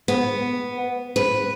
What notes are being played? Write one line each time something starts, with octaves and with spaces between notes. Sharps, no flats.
B3
B4